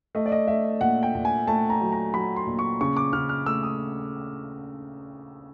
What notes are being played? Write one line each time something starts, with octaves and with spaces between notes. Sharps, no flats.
A3 D#5
D5
D#5
A3 E5
A#2 F#5
G5
A#2
G#5
A3 A5
A#5
F#3
A#5
F#3 B5
C6
A#2
C#6
C#3 C#6
D6
C#3 F6
F6
A3 E6
D#6